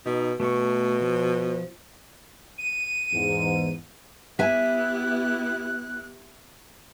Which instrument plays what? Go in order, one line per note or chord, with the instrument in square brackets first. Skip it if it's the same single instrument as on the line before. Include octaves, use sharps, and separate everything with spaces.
[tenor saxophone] B2 [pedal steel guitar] D#4
[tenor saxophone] B2 [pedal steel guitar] A3 C#6
[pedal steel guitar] F3
[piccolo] D#7
[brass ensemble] E2 G#2
[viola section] B3 E4 G4 [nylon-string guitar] E5 G#5 [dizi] F#6